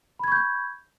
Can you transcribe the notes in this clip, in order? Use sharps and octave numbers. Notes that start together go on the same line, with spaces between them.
B5 C#6 G6 G#6